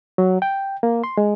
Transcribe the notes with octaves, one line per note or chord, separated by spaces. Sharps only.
F#3
G5
A#3
C6
G#3